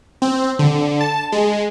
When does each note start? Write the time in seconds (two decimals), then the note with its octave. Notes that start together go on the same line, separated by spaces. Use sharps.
0.22 C4
0.59 D3
1.01 A5
1.32 G#3